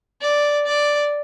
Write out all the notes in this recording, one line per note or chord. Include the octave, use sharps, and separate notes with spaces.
D5
D5